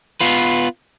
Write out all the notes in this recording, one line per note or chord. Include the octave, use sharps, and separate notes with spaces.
B3 F4 B4